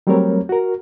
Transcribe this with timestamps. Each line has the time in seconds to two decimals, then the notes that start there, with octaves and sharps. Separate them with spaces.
0.07 F#3 G3 A3 C4 A#4 C#5
0.49 F#4 A#4